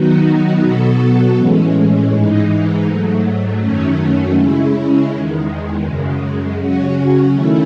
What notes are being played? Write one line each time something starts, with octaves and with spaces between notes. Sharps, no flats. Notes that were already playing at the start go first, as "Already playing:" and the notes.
Already playing: D#3 F#3 B3 D#4 F#4
B2 F#3 B3 F#4 A4
A2 E3 G#3 C#4
G#2 E3 G#3 D#4
G#2 F#3 A3
F#2 D#3 F#3 A3 C#4
C#3 G#3 C#4 E4
E2 D#3 G#3
F#2 C#3 G#3
C#3 F#3 C#4 F#4
D#3 A3 C#4 E4